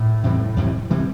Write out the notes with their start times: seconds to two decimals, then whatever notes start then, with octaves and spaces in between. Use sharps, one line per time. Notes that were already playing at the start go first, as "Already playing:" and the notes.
Already playing: A2
0.23 F2 C3 E3 G3
0.57 F2 C3 E3 G3
0.90 C3 E3 G3